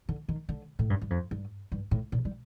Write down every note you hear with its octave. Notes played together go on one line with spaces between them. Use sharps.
D3
D#3
D3
A2
G2
G2
F2
G2
G2
A2
A#2
G3